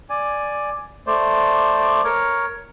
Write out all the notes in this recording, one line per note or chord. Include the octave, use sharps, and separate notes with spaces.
D5 G#5
A3 C5 D5
A#4 C#5